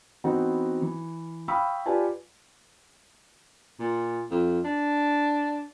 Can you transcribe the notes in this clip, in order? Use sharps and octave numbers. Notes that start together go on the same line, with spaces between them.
E3 B3 C4 D#4 F#4
E3
F5 G5 B5 C#6 D#6 E6
F4 G4 B4 D5 G#5 A5
A#2
F2
D4